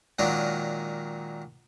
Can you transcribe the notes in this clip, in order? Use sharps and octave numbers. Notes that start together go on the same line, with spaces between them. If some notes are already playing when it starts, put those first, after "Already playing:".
A#2 D#3 F#3 G#3 D4 A#4